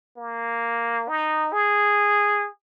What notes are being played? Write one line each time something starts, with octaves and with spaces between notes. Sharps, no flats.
A#3
D#4
G#4